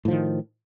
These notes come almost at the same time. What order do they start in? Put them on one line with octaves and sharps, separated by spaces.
A2 F3 D#3